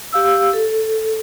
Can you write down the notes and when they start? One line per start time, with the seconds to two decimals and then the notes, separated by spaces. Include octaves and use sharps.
0.13 G4 F5 E6
0.53 A4